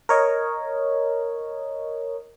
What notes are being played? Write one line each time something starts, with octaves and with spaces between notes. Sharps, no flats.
A#4 C#5 D#5